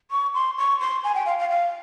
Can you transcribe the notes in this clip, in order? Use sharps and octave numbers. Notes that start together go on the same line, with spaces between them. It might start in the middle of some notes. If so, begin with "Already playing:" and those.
C#6
C6
C#6
C6
G#5
G5
F5
F5
F5